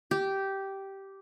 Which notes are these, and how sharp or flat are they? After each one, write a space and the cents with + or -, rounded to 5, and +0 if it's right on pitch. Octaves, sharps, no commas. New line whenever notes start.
G4 -10